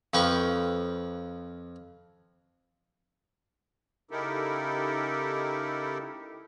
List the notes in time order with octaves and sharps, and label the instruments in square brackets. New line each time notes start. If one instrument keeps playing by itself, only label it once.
[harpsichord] F2 F3 B4 G5 C#6
[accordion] C#3 D#4 E4 G4 A4 A#4